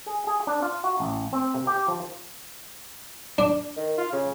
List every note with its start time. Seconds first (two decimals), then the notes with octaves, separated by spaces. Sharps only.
0.06 G#4
0.27 G#4
0.47 D4
0.62 F4
0.84 F#4
1.00 A1
1.33 C4
1.55 C3
1.67 G4
1.88 F3
3.38 D4
3.76 D#3
3.98 F4
4.12 C#3